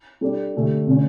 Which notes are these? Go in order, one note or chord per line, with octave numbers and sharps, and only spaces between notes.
G3 D4 A4 D5
D3 A3 D4 G4
D3 A3 C#4